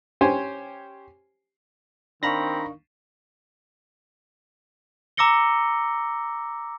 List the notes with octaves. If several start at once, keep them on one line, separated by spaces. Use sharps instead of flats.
C#4 G4 C5 G#5
D#3 C4 D4 F5 A#5 B5 C#6 A#6
A#5 D6 E6 A#6 C#7 G7